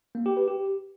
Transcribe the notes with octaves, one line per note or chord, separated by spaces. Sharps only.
A#3
G4
B4
G4